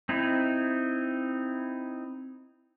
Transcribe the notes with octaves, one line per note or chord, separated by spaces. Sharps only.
C4 D#4 E4